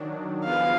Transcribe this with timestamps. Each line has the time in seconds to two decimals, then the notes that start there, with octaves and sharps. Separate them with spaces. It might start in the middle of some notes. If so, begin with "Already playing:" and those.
Already playing: D#3 F#3 D4
0.44 F3 B3 F4 G#4 B4 F5